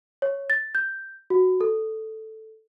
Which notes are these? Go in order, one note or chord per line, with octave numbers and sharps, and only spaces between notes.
C#5
A6
G6
F#4
A4